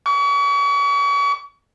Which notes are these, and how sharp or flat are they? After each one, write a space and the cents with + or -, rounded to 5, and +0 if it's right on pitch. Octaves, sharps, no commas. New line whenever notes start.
C#6 +40